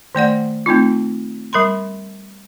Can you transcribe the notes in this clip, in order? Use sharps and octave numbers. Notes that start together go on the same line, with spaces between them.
D#3 A3 D5 F#5
A3 C4 D#4 F4
G3 A#4 B5 C6